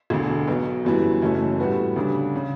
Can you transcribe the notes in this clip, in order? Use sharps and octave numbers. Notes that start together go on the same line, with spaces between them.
E1 D2 D3
B1 B2 F#3 B3
G1 F#2 E3 G3
F#1 F#2 E3 A3 C#4
A2 G3 B3 F#4 B4
D2 C#3 G3 D4
C#3